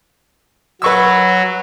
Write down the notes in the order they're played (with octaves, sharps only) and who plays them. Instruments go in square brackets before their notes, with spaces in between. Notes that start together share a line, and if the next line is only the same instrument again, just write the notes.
[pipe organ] F#3 [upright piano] B4 C#6 E6